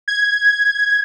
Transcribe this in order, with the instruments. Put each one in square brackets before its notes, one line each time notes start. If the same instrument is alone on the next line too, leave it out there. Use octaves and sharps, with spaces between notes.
[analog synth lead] G#6